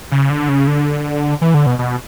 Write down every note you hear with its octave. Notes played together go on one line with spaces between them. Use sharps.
C#3
D3
C#3
D3
E3
D3
B2
B2